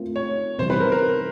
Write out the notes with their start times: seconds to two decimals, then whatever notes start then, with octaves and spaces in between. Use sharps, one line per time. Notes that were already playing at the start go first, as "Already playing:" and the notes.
Already playing: A3 C4 F4 A#4
0.16 C#5
0.58 C3 E3 G3 B3 E4 C5
0.70 B4
0.80 A#4
0.92 A#4